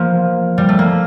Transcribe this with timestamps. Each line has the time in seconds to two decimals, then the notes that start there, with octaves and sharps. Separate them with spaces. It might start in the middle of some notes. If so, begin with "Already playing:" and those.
Already playing: F3 A#3
0.58 G3
0.69 A3
0.79 A#3